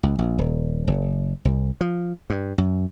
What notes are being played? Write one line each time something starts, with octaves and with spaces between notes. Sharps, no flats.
C#2
A#1
D#1
F#1
C2
F3
G2
F#2